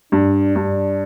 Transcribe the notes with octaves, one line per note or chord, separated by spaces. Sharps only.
G2 D4
G2